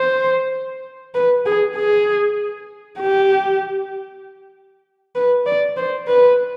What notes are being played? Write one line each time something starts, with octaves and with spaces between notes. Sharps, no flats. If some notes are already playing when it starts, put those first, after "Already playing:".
Already playing: C5
B4
G#4
G#4
G4
B4
D5
C5
B4